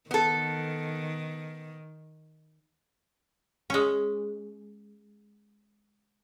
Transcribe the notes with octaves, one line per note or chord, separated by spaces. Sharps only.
D#3 B3 A4
G#3 C#4